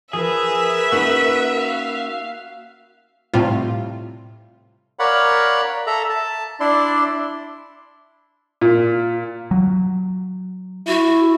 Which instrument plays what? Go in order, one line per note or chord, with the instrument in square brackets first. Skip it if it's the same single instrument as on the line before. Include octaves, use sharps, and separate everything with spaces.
[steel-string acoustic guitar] F3 [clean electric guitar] G#4 [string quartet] A#4 B4 [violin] E5
[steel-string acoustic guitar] A#3 C#4 D#4 [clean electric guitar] F#4
[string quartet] F5
[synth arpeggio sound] A2 C3 G3 F4
[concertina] A#4 C#5 D5 F5 F#5 B5
A4 E5 A#5
A5
D4 E4 D5 C6
[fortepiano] A#2
[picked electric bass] F#3
[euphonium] E4 [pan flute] F#4